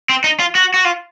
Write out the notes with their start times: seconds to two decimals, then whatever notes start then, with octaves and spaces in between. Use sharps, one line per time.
0.09 C4
0.24 D#4
0.40 F4
0.55 F#4
0.74 F#4
0.85 F4